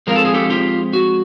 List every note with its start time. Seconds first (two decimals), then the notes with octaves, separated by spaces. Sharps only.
0.07 F3 G#3 C4 F4 A#4
0.16 A4
0.25 G#4
0.34 G4 A4
0.50 F4 G4
0.93 F#4